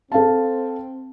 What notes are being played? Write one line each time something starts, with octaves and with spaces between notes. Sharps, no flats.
C4 A4 F5 A5